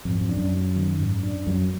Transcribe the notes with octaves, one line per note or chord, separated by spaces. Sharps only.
F2 G#2
F2
D4
F#2
F#3
D#3
G#2
D4
F#2 F#3